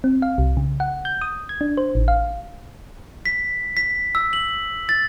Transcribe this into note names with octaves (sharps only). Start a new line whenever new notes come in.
C4
F5
C2
C#3
F#5
G6
D#6
G#6
D4
C5
A1
F5
B6
B6
E6
F#7
A6